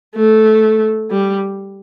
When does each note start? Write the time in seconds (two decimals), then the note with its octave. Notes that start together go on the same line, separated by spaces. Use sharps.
0.16 A3
1.11 G3